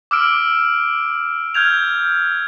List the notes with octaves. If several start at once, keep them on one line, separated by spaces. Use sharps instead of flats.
D6 E6 F6 D7
F6 G6 G#6 F7